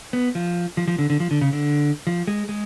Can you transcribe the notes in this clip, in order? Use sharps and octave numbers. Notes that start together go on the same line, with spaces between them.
B3
F3
F3
F3
D3
D3
F3
D3
C#3
D3
F3
G#3
G#3